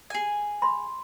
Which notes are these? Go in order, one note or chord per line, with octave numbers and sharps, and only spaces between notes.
G#4 G#5
B5 C6